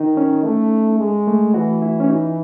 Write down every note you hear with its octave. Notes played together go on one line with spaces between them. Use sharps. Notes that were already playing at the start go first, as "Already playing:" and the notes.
Already playing: D#3 D#4
C#4
A3
G#3
A3
E3 F#4
E4
C#4
D#4